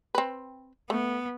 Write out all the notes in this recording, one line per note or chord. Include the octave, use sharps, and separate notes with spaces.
C4 B4
A3 B3